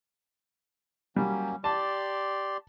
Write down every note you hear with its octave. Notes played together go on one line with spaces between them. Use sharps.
F#3 G3 A#3 C#4
G4 D5 A5 C6